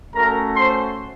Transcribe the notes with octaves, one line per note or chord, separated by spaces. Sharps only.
A3 C#4 F#4 A#4 A#5
C5 C6